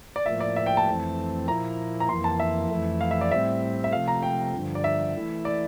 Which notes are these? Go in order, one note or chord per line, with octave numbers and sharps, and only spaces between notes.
D5
A2 F3 A#3 E5
D5
E5
G5
A5
F2 E3 A3 C4
A#2 F3 A#3 E4 A#5
A#5
F2 E3 A#3 C6
A5
E5
F2 E3 A3 E4
F5
E5
D5
A2 G3 C4 E5
E5
C3 F3 A3 F5
A#5
G5
G2 D3 F3
D5
E5
E3 A3 E4
D5